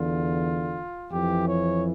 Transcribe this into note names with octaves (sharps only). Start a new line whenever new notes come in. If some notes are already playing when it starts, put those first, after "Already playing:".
Already playing: E2 D3 F4
F2 E3 G4
C#5